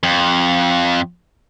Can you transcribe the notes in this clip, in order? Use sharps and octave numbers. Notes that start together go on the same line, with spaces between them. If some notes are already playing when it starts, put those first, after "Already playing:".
F2